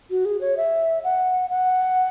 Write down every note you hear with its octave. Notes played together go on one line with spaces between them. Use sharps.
F#4
G#4
C#5
E5
F#5
F#5